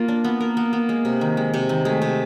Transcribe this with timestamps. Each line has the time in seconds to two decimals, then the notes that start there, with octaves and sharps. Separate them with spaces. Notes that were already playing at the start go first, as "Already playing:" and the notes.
Already playing: A#3 F4
0.08 D4
0.24 B3
0.40 A#3 A#4
0.57 B3
0.73 B3
0.89 G#3
1.05 C3
1.21 D#3
1.37 G#3
1.54 C3
1.69 D#3
1.85 G#3 A3
2.02 C3